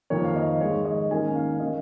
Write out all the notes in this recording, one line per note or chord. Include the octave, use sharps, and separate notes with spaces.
F2 D#3 A#3 C#5
F5
D#5
G#2 D#3 G#3 C#5
D#5
G#2 D#3 A#3 C#4 G#5
F5
F5
D#3 A#3 C#4 D#5